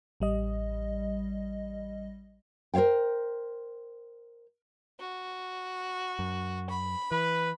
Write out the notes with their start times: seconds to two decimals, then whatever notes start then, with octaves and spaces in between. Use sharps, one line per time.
0.20 A1 G3 D#5
2.74 A#4 C5 C#5 F5 G5
5.00 F#4
6.19 F#2
6.69 B5
7.11 E3 B4